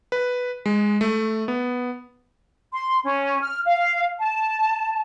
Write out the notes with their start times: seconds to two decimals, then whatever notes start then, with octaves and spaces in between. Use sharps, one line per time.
0.12 B4
0.66 G#3
1.01 A3
1.48 B3
2.72 C6
3.04 C#4
3.41 F6
3.66 F5
4.19 A5